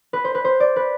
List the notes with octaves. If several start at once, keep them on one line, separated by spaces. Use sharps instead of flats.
B4
C5
B4
C5
D5
B4